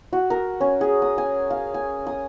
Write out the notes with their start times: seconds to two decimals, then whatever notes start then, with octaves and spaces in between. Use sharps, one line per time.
0.13 F#4
0.30 A#4
0.61 C#4
0.81 G#4
1.02 D#6
1.18 G#5
1.50 F5
1.74 G#5
2.07 D#6